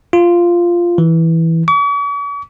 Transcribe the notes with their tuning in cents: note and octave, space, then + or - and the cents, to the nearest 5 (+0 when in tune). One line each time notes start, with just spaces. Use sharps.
F4 -5
E3 -10
C#6 +45